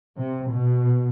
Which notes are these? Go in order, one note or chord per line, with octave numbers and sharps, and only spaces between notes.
C3
B2